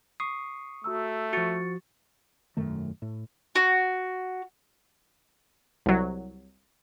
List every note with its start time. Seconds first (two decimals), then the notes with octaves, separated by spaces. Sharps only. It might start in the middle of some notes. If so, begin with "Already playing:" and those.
0.20 C#6 D#6 C7
0.84 A3 F#4 A#5 E6
1.33 F3 F#4 C#6 A6 C#7
2.57 E1 F#2 D#3 A3
3.02 A2
3.56 F#4
5.86 C2 F#3